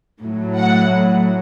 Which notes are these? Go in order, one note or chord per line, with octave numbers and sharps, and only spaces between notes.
A2 F#3
F#5